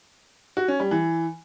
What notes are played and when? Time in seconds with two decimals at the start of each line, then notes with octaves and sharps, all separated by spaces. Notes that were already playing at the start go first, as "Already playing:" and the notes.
0.57 F#4
0.68 C#4
0.80 G3
0.91 E3